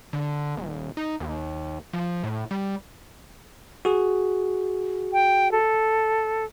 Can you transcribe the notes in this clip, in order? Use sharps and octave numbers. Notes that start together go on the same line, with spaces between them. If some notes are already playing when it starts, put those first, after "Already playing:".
D3
D#1
D#4
D#2
F3
A2
G3
F#4 G#4
G5
A4